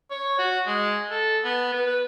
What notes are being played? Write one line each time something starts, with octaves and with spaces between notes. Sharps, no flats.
C#5
F#4
G#3
A4
B3
B4
B4